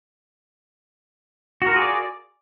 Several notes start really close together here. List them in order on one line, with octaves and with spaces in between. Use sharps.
F#4 A#4 F4 G#4 D5